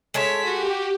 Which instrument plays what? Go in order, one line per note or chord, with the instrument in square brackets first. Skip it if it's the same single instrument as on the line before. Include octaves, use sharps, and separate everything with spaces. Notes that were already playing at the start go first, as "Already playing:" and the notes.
[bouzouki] G#3 A3 A5 [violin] C#5 B6
[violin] F#4 [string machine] G4